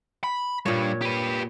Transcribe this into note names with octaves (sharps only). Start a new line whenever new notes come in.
B5
G2 A#2 C#5
G4 B4